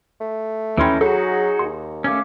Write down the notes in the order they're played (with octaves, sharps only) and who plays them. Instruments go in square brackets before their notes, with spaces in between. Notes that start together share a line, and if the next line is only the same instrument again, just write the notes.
[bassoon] A3
[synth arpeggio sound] D#2 C6 [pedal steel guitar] E3 C#4 D#4 [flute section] G5 B5
[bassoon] F#3 [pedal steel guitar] D#4 F#4 [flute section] G#4 [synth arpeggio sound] A4
[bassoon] D#2 [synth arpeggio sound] C6
[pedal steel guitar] A3 C#4 [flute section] F5 D6